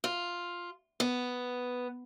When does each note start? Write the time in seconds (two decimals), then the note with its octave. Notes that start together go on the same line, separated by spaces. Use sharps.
0.04 F4
1.00 B3